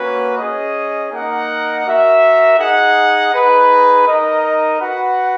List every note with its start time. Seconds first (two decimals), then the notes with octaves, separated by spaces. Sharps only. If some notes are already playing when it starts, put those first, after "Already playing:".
Already playing: A#3 C#4 F#4 B4
0.37 C#4 G#4 D#5
1.11 A#3 D#4 A#4 D#5 F#5
1.85 F#4 A#4 E5
2.57 D#4 G#4 D#5 F#5
3.31 D#4 G#4 B4
4.04 D#4 A#4 D#5
4.79 F#4 B4 F#5